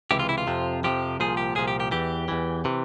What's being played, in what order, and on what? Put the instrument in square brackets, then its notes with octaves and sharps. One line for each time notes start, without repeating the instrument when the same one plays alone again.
[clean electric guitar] C#2 C3 E3 G4
F4
E4
F4
F2 C3 F3
F2 C3 F3 G4
C2 A#2 F3 G#4
G4
C2 A#2 F3 G#4
G4
G4
E2 E3 G4
E2 E3
C3 E3